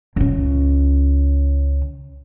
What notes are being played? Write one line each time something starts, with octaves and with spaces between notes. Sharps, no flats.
C#2 C#3